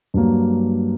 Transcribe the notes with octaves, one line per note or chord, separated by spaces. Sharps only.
G2 F#3 A#3